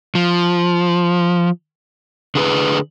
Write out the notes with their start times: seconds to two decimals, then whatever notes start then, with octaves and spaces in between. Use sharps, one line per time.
0.15 F3
2.35 D3 G#4 B4